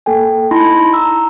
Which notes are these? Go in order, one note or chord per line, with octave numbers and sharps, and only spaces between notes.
A#3 A4 G5 G#5
D#4 E4 A5 B5 C6 A#6
A#5 E6